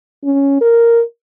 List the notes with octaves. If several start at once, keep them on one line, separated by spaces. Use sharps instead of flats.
C#4
A#4